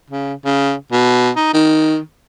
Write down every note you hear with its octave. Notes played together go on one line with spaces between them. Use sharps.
C#3
C#3
B2
D#4
D#3